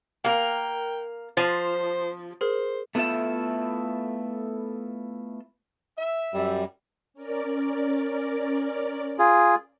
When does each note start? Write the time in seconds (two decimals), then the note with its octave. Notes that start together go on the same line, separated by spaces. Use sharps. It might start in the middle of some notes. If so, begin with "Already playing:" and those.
0.24 A#3 A#4 F5 G5
1.37 F3 C5 A6 D#7
2.41 G#4 A#4 C5
2.95 A3 B3 E4 F4 A4 E5
5.98 E5
6.34 F#2 G3
7.14 C#4 A#4 D5
9.19 F4 G#4